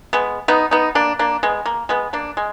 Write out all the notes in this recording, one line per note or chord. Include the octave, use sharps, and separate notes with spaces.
G#3 B3
B3 D#4
B3 D#4
A#3 D4
A#3 D4
G#3 B3
A#3
G#3 B3
A#3 D4
G#3